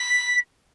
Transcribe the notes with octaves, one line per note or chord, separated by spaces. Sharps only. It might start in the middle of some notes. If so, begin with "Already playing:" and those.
Already playing: B6